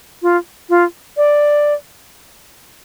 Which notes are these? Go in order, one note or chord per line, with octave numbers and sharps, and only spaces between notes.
F4
F4
D5